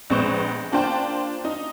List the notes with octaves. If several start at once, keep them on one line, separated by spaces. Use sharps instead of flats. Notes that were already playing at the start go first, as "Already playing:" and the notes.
A#1 G#3 B3 C4 C#6 E7
A#3 D4 F4 C5 G5 A5
D#4